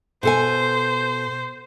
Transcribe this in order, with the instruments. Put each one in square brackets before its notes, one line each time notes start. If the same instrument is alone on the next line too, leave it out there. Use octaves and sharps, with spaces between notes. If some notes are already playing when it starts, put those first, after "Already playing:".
[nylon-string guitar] B2 A4 G#5 [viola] C5